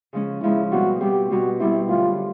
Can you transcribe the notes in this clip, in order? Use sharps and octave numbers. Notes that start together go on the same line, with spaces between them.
C#3 F3 G#3 C#4
C#3 F3 G#3 C#4 E4
B2 G3 C4 F#4
B2 G3 C4 G4
B2 G3 C4 F#4
B2 G3 C4 E4
F#2 D3 F#3 A3 F4